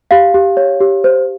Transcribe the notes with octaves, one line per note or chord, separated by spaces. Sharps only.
G4 F5
G4
C#5
G4
C5